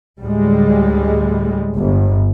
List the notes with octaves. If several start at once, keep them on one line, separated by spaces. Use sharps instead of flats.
D2 A2 G3 G#3
G1